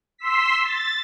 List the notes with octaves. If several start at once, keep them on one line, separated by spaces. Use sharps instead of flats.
C6 E6 B6
A6